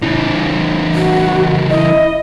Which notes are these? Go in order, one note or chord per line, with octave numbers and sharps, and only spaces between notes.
C#3 E3
F#4
E4 D#5